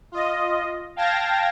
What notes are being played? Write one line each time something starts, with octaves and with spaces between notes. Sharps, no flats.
F4 D#5
F5 G5 A5 G#6 A#6